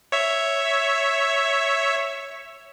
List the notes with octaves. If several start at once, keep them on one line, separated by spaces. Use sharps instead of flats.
C#5 E5